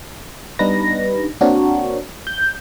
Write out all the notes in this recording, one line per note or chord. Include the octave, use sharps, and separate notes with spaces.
G3 B3 D4 D#4 B4 A#6
A#3 C4 D4 F#4 A#4 C#5
G6